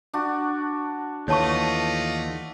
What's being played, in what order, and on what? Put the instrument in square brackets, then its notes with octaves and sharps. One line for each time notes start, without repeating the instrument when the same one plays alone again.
[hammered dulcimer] D4 F#4
[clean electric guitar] D#2 E3 [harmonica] A3 F4 D#5 [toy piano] C#5 A5 C#6